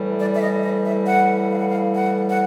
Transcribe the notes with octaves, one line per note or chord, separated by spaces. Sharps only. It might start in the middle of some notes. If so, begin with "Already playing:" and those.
Already playing: A2 E3 G3
D5
E5
D#5
D#5
E5
F#5
F5
F#5
F5
F#5
F#5